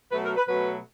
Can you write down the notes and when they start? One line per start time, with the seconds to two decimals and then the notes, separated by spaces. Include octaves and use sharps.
0.12 B2 F#3 A3 B4
0.24 A#4
0.37 B4
0.48 B2 F#3 A3 B4